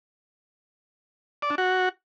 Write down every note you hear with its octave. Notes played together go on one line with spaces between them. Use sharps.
D5
D4
F#4